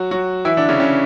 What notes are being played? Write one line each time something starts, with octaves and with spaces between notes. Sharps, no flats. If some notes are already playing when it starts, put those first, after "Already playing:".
Already playing: F#3 F#4
F#3 F#4
E3 E4
D3 D4
C#3 C#4
C#3 C#4